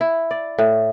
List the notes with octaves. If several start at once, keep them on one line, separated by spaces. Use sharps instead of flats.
E4
D5
A2